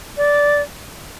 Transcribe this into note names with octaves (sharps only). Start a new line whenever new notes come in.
D5